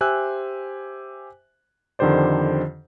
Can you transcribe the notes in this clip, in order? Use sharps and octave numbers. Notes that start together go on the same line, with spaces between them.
G4 C5 E5 G#5 E6 F#6
F2 D3 D#3 G4 C5 D5